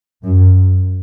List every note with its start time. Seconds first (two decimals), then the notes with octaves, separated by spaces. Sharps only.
0.24 F#2